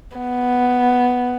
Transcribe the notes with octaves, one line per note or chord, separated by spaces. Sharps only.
B3